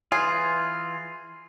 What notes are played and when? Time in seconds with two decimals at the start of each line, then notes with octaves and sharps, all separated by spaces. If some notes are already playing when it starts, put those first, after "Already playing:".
0.12 E3 F4 G#4